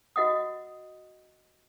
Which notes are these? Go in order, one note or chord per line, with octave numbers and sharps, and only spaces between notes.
F#4 D#5 F#5 D#6